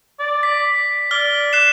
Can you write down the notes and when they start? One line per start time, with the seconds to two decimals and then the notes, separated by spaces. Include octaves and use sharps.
0.20 D5
0.43 B6
1.11 D5 F6 G7
1.53 F#6 C7 E7